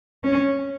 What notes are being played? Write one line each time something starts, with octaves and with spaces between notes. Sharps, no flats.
C#4